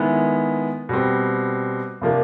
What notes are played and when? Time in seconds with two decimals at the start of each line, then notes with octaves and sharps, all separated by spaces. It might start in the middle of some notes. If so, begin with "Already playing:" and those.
Already playing: D#3 G#3 B3 E4
0.89 B2 G3 C4
2.02 C3 F3 A#3 D4